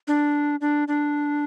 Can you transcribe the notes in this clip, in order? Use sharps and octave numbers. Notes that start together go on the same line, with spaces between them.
D4
D4
D4